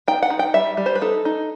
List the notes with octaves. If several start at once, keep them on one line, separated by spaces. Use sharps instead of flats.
D#4 G5
F#5
D#4
G5
G3 E5
G3
C5
B4
D#4 A4
D#4